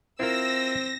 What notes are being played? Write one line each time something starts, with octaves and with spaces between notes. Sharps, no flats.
C4 E4 F4 A#4 E6 A#6